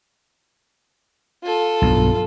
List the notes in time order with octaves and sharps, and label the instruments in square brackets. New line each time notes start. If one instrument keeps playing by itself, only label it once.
[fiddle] F4 A4
[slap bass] B1 G2